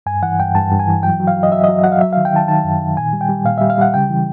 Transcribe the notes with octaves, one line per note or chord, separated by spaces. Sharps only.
G2 G#5
E3 F#5
G2 G5
G2 A5
G2
G#5
E3
F#3 G5
F#3
F5
F#3
D#5
F#3 E5
D#5
F#3
F#3 F#5
F5
F#3 E5
F5
D#3
G5
D#3 A5
D#3 A5
F#2
D#3
A#2 G#5
G3
G5
G3
A#2 F5
E5
G3
F5
G3 F#5
C#3 G5
E3